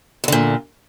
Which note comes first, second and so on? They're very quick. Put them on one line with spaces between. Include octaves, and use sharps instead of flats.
E2 D3 A#2